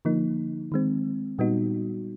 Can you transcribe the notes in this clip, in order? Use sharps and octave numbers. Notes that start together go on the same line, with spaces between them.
D3 F3 A#3 D#4
D#3 G#3 C4
A#2 G3 B3 D#4 F#4